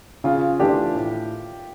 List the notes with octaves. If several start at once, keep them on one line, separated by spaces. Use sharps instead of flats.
C#3 F4
E3 A3 D4 F4 G4
A2